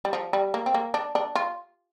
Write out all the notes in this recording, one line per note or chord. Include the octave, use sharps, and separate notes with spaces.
G3
F3
G3
A#3
C4
A#3
D4
D4
F4